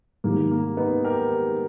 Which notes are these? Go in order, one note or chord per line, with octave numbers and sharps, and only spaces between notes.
G#2 D#3 G3 A#3
A#3
B3 D#4
G4 A#4